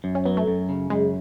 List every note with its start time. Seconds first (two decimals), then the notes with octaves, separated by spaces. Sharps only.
0.04 F#2
0.15 C#4
0.26 F#3 B3
0.37 A3
0.47 F#2
0.69 C#3
0.90 F#2 G#3